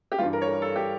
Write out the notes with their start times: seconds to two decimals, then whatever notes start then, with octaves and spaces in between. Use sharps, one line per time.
0.12 G4
0.18 G2 E3 G3 F4
0.33 A#4
0.41 C#5
0.48 A#4
0.62 A4
0.76 G4